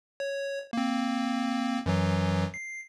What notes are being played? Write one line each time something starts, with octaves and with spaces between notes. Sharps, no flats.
C#5
A#3 C4
F#2 E3 F#3
C7